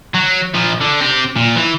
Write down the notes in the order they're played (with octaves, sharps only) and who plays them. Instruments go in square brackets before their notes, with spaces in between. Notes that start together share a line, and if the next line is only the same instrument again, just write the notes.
[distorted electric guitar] F#3
A#2 F3
D3
C4 G4
A#2
E3 E4